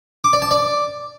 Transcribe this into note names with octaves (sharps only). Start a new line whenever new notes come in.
D6
D5
A5
D5